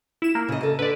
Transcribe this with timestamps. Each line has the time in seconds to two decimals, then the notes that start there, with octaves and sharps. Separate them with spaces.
0.22 E4 E7
0.35 A#3
0.48 C#3 D#5
0.61 A4 D#5
0.79 D3 B4 D5